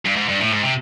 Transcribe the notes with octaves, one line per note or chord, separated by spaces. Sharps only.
G2
G#2
G2
A2
G#2
C3